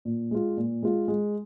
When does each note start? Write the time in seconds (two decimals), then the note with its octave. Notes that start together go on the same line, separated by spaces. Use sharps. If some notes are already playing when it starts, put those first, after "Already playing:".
0.05 A#2
0.31 G#3 F4
0.57 A#2
0.83 G#3 F4
1.08 G#3